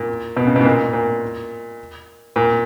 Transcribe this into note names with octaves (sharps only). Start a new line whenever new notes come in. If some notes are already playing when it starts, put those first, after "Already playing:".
Already playing: A#2
B2
C#3
B2
G#2
A#2
A#2
A#2